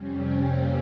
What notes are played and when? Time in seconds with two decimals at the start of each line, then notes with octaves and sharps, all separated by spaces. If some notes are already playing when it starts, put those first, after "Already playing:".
Already playing: F2 C3 G3 C#4
0.19 C4
0.50 A#3